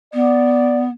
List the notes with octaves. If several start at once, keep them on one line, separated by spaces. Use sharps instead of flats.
B3 D5